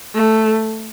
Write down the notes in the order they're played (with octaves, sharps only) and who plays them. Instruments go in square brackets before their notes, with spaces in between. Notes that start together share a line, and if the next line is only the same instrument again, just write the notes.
[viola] A3